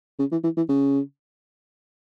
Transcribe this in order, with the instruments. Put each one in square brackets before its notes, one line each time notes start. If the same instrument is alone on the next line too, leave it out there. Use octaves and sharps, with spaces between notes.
[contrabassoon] C#3
E3
E3
E3
C#3